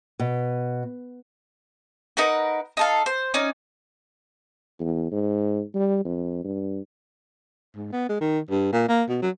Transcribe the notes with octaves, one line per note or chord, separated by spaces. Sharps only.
B2
D#4 A#4 B4 F#5
D#4 A4 F5
C5
C#4 D#4 D5
E2
G#2
G3
F2
G2
G#2
B3
G#3
D#3
G2
A#2
A#3
B2
F#3